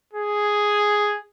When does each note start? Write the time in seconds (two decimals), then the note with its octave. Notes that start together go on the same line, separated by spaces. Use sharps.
0.13 G#4